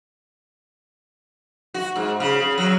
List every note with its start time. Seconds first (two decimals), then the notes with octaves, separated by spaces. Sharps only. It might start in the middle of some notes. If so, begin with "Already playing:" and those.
1.74 F#4
1.96 G#2
2.20 C#3
2.40 C#3
2.58 F#3